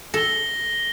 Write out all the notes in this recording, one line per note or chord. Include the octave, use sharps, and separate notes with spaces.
A4 A#6 G7